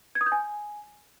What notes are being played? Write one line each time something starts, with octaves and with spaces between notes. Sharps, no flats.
G#6
D#6
G6
G#5